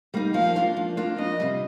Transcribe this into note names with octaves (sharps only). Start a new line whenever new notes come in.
G3 A#3 D#4
F3 F5
A#3 D4 F4
F3
A#3 D4 F4
F2 D#5
C3 G3